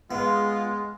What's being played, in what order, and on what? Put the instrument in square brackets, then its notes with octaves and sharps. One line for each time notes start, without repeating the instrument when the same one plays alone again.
[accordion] G#3 [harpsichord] B3 [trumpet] F4